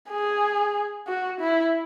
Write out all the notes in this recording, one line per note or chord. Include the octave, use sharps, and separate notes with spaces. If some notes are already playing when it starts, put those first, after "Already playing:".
G#4
F#4
E4